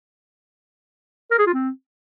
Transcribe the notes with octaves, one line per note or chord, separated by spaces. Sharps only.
A#4
G#4
F4
C4